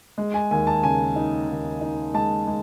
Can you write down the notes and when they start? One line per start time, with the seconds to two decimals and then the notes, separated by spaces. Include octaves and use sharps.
0.18 G#3
0.34 G#5
0.51 D#2 G#5
0.67 A5
0.83 C#3 G#5
1.16 D#4
1.49 D#2
1.81 D#4
2.14 G#3 A5
2.47 G#3